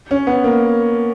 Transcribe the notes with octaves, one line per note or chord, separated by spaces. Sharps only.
C#4
B3
A#3